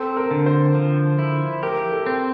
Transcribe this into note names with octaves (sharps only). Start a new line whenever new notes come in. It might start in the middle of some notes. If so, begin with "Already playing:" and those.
Already playing: C4 A4
A#4
D3
C5
F3
E4
G4 A#4
A4
C4